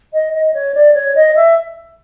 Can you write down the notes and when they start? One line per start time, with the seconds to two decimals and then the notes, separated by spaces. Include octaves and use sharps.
0.13 D#5
0.33 D#5
0.54 C#5
0.74 D5
0.94 C#5
1.15 D#5
1.36 E5